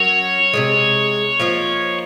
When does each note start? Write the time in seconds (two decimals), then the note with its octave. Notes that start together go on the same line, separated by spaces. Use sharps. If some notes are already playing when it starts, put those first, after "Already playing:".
Already playing: F#3 C#4 F#4 A#4 C#5
0.53 C3 D#3 G#3
1.39 F3 A#3 D#4